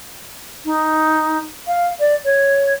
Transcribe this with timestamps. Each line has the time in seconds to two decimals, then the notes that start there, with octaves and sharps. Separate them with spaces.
0.65 D#4
1.67 F5
2.00 D5
2.25 C#5